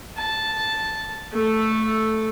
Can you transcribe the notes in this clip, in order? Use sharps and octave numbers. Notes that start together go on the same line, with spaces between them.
A5
A3 A4